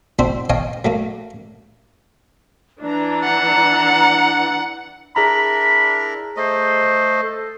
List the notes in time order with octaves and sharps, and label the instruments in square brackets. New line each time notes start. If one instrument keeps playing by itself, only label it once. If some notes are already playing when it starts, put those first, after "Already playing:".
[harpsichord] C4 D4 E4 F#4 C5 E5
C#5 D#5 F5 G5 A5 D#6
F#3 A3 A#3
[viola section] E3 D4 [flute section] A#5
[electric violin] F#5
[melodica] D4 E4 A#4 [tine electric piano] G#4 A#5 [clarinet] B5
[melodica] A3 D#5 [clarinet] C5
[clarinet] A4